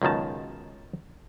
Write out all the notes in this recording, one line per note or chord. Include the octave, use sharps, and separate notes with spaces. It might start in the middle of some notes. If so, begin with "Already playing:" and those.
C#2 F#2 B2 D#3 A5